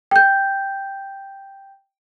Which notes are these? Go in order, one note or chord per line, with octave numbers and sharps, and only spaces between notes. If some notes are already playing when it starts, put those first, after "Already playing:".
G5 G6